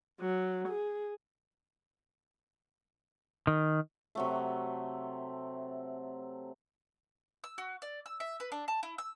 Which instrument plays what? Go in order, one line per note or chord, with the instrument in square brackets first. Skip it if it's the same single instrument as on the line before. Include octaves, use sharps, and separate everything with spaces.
[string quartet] F#3
G#4
[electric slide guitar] D#3
[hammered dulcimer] C3 F#3 A3
[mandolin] E6
F#4
D5
E6
E5
B4
D4
A5
E4
E6